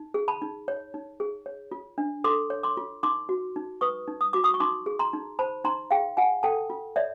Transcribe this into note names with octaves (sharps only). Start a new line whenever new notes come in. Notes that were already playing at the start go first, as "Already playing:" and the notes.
Already playing: D#4
G#4
A5 B5
D#4
C#5
D#4
G#4
C#5
F4
D4
A4 C6 D6
C#5
C6 D6
F4
D#4 C6 D6
F#4
D#4
B4 C#6 D#6
D#4
D#6
F#4 D6
C#6 D#6
C#6
D#4 C6 D6
G#4
A#5 C6
D#4
C5 A5 B5
D#4 A#5 C6
G#4 F5 G5
F4 F#5 G#5
A4 G5 A5
F4
C#5 D5 E5